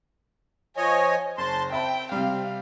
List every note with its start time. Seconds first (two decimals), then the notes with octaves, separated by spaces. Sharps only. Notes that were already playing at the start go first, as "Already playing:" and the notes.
0.77 F3 C#5 D#5 G#5
1.38 F#1 C5 A5 C6
1.72 C4 E5 G5 A5 B5
2.12 C3 G3 F5